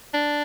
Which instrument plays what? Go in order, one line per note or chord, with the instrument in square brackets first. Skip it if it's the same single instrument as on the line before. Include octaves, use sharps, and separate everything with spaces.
[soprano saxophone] D4